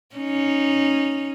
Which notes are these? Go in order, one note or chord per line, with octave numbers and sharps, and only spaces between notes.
C#4 D#4